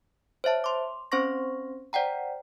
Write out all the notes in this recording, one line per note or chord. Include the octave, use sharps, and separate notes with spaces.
C5 C#5 E5 A5
C6 D6
C4 C#4 C5 C6 C#6 A#6
C5 D5 F#5 G5 A#5